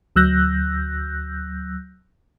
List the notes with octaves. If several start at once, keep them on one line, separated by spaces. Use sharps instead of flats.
D2 F#3 E6 F#6 G6 A#6